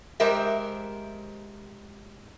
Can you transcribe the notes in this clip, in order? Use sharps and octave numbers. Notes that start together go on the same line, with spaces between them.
G#3 G4 A#4 C5 E5